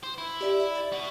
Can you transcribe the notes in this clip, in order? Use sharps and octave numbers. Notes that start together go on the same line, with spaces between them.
C5
E4
G4 D5 E5
E5
D5 A6
B3 F#4